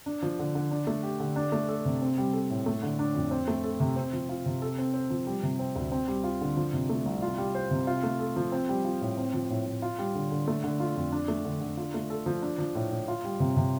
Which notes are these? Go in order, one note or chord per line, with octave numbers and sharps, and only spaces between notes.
D4
F3
D3
D3
D4
A3
G4
D3
D4
A3
A4
C3
C4
G3
A4
A2
A3
D3
D4
F2
C4
A3
A4
C3
C4
F3
F4
C3
A4
C4
C5
F3
G3
C3
C4
D2
C4
G3
F4
D3
F3
C3
A3
C2
F4
G3
C5
C3
F4
A3
A4
F3
C4
G3
F4
A2
C4
F3
A2
A2
F4
G3
D3
D3
A3
D3
F4
F2
D4
A3
D3
D3
F4
A3
A4
F3
D4
F3
A2
A2
F4
G3
C3
C3